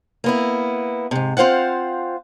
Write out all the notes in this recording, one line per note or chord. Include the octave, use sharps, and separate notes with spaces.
A#3 B3 E4
G#2 C3
C4 F4 C5 F5 F#5